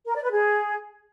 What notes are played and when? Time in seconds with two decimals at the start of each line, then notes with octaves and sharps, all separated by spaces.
0.07 A#4
0.15 D5
0.23 B4
0.31 G#4